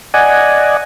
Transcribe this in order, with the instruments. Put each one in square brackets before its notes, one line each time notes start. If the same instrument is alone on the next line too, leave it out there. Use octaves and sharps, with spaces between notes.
[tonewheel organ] D5 D#5 F#5 G#5